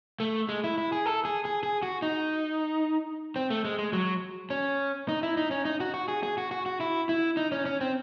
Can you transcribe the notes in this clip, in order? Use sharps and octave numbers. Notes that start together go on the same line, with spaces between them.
A3
G#3
E4
E4
G#4
A4
G#4
G#4
G#4
F#4
D#4
C4
A3
G#3
G#3
F#3
C#4
D#4
E4
D#4
C#4
D#4
F#4
F#4
G#4
G#4
F#4
F#4
F#4
E4
E4
D#4
C#4
C#4
C4